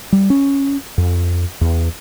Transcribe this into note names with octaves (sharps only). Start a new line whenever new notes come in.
G3
C#4
F2
E2